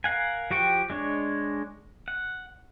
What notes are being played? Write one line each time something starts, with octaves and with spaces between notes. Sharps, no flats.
A#4 F5 F#5 G#5
F3 F#4 G4 G5 C#6
G#3 D4 C#5
F#5